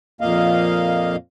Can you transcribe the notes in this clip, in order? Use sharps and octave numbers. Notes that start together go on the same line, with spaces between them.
F2 A#2 A#3 D#5 F5